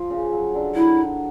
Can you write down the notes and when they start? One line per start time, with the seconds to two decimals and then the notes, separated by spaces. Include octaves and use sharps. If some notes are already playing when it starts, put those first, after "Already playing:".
Already playing: F3
0.10 C#3
0.33 F#3
0.54 D3
0.75 F#3 E4
0.98 F#3